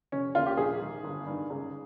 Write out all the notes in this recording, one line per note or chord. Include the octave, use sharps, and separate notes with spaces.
F1 C#4
D#2 C#3 F4
G4
A#1 G#4
G#2 D#3
G1
G2 D#3
C#2